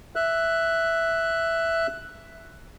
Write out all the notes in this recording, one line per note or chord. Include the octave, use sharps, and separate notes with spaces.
E5 F#6